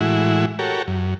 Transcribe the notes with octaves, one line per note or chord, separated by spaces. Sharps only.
A2 E3 G#3 E4 F#4
F#4 G4 A4 A#4 C#5
F#2